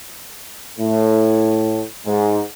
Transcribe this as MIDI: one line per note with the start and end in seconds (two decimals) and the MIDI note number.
0.79 1.82 45
2.06 2.40 44